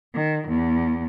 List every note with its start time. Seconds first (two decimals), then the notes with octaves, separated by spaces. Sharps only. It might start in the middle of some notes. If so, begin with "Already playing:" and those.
0.13 D#3
0.47 E2